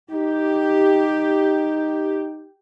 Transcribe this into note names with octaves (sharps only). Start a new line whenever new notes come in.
D#4 G4